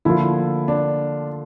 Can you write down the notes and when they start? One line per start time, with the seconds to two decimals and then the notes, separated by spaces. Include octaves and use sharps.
0.05 D3 F3 A#3 E4 F4
0.68 D4